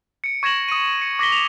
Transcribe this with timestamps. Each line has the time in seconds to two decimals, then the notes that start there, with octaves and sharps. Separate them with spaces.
0.24 C#7 D7
0.43 C#6 G#6 A#6 E7 F#7
0.68 D#6 C#7 D#7
1.02 C#7
1.19 D6 A#6 B6 G7
1.32 E7 F7